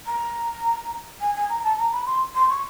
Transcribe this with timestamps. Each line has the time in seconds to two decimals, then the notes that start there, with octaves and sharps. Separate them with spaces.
0.06 A#5
1.21 G#5
1.35 G#5
1.50 A#5
1.64 A5
1.78 A#5
1.93 B5
2.06 C6
2.35 C6
2.50 C#6